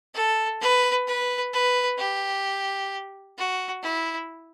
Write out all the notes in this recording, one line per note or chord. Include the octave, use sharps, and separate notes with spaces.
A4
B4
B4
B4
G4
F#4
E4